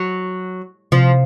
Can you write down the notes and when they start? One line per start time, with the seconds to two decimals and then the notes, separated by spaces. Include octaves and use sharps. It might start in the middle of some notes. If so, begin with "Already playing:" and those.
Already playing: F#3
0.92 C3 F3